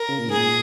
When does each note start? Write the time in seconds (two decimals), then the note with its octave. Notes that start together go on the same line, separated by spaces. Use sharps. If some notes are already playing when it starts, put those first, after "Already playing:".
Already playing: A#4
0.09 C#3
0.19 A#2
0.28 G#2 G#4
0.38 A#2